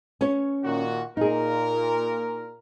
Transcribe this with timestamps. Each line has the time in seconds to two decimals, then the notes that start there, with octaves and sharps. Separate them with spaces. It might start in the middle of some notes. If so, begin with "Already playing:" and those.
0.21 C#4 C#5
0.64 A#2 D#3 F#4
1.17 A#2 D#4 G#4 A#4